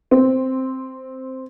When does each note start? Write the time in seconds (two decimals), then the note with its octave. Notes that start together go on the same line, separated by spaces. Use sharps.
0.11 C4